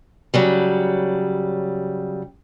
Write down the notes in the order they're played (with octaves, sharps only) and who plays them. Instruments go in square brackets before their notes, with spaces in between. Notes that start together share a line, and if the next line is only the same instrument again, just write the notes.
[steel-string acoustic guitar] C#3 F#3 G3